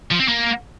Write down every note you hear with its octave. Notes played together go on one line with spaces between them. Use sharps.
F3
C4
A#3